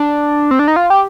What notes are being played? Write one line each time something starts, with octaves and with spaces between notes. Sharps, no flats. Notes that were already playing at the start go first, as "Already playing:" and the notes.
Already playing: D4
C4
D4
D#4
F4
G4